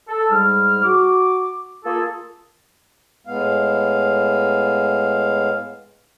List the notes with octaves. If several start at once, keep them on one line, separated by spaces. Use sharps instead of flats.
A4
G#2 G3 F6
F#4 D6
A#3 F4 G#4 A4
A2 G#3 B3 F5